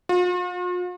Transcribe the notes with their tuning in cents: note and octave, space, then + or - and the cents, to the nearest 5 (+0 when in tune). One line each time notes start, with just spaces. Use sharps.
F4 +45